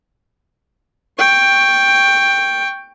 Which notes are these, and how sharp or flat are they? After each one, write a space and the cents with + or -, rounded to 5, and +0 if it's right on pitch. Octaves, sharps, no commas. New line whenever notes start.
G5 +10 C#6 +0